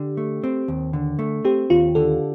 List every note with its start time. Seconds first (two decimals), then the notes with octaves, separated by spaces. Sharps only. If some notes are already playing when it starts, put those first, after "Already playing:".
Already playing: D3 G4
0.17 A3
0.44 C4
0.68 D#2
0.93 D3
1.19 A3
1.45 C4 G4
1.70 D#2 F4
1.95 D3 A4